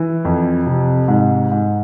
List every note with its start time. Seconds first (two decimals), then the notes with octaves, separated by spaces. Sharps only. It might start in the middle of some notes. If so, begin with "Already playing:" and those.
Already playing: E3
0.25 F2
0.67 C3
1.08 G#2
1.51 G#2